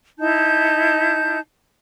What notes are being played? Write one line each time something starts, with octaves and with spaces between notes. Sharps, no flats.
D#4 E4 A5 G6